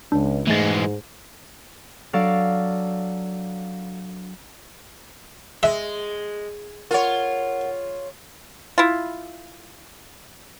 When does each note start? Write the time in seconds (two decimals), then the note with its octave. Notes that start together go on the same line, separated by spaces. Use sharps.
0.12 C#2 D4
0.47 G#2 E3 G#3 A3 A6
2.13 F#3 D4 A4 D5 F5
5.63 G#3 E5
6.91 F4 A#4 C#5 F#5
8.78 E4 F4